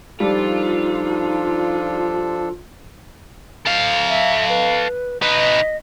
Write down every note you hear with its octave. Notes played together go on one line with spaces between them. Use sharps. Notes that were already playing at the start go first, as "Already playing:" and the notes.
F3 G3 D4 D#4 F4 A4
A4 F5
E5
B4
D#4 B4 D#5